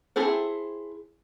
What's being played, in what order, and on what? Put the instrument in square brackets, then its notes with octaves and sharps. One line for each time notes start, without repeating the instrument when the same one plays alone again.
[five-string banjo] C4 E4 G#4 A4 C5